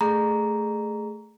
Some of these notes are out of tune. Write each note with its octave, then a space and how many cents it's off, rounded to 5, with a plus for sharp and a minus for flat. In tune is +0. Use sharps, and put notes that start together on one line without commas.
A3 +0 G#4 +0 A#5 +0